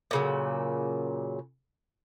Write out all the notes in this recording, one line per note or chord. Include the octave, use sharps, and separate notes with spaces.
A#2 C#3 F#3